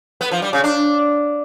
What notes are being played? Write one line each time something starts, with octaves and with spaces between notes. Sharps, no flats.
B3
F3
G3
C#3
D4